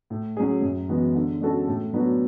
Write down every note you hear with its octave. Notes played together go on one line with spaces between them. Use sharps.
A2
F#3 C#4 G#4
F#2
E3 G#3 B3 F#4
D3
G#3 C#4 F#4 A4
A2
F#3 B3 D4 F#4